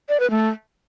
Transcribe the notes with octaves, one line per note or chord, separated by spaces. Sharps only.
D5
B4
A3